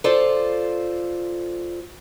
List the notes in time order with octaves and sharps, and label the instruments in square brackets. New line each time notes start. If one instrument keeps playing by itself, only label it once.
[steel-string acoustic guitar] F4 A4 C5 D5